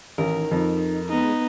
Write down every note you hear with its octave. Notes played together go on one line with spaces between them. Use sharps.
A1 D#3 A#4
F2 D#4
G#3 B3 D#4